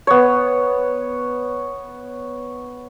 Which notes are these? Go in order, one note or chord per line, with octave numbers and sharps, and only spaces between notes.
B3 C#5